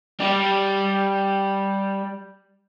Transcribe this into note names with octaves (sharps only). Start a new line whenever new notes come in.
G3 G4